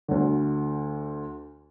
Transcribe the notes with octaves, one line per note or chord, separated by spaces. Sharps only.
D2 D3